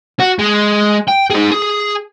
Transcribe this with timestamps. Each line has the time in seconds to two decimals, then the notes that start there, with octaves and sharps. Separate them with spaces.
0.20 F#4
0.39 G#3
1.08 G5
1.30 D#4 G#4
1.51 G#4